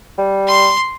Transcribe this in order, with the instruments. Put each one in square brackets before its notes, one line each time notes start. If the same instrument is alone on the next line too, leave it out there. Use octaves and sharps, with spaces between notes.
[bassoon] G3
[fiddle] C6